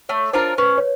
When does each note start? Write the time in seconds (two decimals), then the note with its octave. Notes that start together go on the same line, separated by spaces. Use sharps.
0.09 A3 C#5
0.33 D4 F4 A#4 C5
0.58 C#4 B4
0.78 C#5